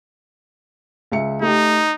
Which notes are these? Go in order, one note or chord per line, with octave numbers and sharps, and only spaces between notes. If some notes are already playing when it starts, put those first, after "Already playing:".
C#2 E5 C#7
A3 D#4 G4